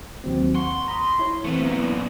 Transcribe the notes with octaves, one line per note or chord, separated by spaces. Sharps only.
D#2 F#3 C4
F#5 C6 C#6
A#5 B5 D#6
E4 C#5
E3 A3 B3 C4
F#2 A#2 B3 E4